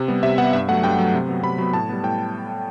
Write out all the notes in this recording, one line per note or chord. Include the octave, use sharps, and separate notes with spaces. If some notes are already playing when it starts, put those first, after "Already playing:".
Already playing: C3
G3 B3
C3 E5
G3 B3 F#5
G2 E5
F#3 A3 F#5
G2 G5
F#3 A3
C3
F#3 B3
C3 B5
F#3 B3
A2 A5
G3 B3
A2 G5